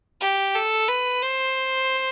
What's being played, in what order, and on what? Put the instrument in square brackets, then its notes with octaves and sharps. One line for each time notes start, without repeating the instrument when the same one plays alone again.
[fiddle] G4
A4
B4
C5